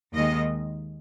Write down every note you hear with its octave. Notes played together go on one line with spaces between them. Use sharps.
D#2 D#3 G#3 D#5